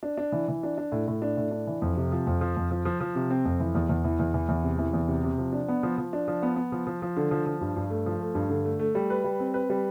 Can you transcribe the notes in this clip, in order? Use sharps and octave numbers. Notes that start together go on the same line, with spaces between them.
D4
D4
E3
E3
D4
D4
A2
A2
D4
A2
D4
E3
F2
C3
F3
F2
F3
F2
F3
F3
F3
C3
C4
F2
E3
E2
E2
E3
E2
E3
E2
C3
E3
E2
C3
C3
F3
D4
B3
F3
F3
D4
F3
B3
B3
F3
F3
F3
D3
F3
F3
G2
G2
A3
F3
A3
G2
D3
A3
A3
G3
B4
G3
C4
B4
G3